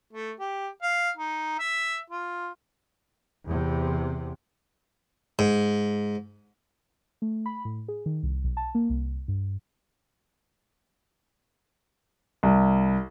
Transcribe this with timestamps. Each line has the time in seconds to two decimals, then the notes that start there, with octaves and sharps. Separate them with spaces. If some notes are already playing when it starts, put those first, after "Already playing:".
0.13 A3
0.40 G4
0.82 F5
1.17 D#4
1.59 E5
2.10 F4
3.46 E2 C3
5.39 G#2
7.22 A3
7.46 B5
7.65 A2
7.88 G#4
8.06 D#3
8.23 C2
8.44 B1
8.57 A5
8.75 A#3
8.90 C2
9.28 G2
12.43 C2